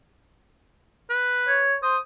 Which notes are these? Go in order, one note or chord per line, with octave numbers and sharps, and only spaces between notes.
B4
C#5
C5 D#6